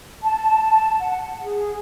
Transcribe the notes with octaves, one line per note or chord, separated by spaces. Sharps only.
A5
F#5
G#4